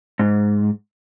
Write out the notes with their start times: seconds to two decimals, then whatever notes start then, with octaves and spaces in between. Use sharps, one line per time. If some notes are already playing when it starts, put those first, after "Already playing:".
0.19 G#2